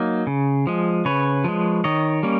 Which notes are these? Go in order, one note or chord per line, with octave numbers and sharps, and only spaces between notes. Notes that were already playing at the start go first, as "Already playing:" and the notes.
Already playing: F#3 A#3 D#4
C#3
F3 G#3
C#3 B4 C#5
F3 G#3
D#3 C#5 D#5
G3 A#3 C#4